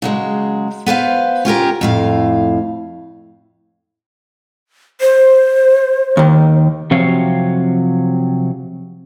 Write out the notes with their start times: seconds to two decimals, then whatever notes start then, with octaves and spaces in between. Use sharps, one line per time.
0.02 C#3 F#3 G#3
0.86 B3 B4 C5 F5
1.45 C#4 F4 G4 A#4
1.81 F2 A2 F5
5.01 C5
6.17 D#2 D#3
6.91 C3 F3 F#3 C4 C#5 F5